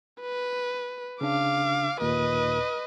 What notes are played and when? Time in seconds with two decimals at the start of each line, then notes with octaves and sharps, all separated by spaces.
0.21 B4
1.21 C#3 D4 F5 D6
2.01 D#2 A#2 B4 D#5